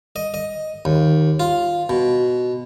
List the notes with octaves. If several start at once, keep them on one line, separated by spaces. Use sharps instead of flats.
D#5
D#5
D#2
F4
B2